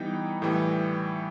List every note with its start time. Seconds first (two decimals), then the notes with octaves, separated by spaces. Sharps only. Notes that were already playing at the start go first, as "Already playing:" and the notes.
Already playing: E3 G3 B3 D#4 G5
0.42 A2 E3 G3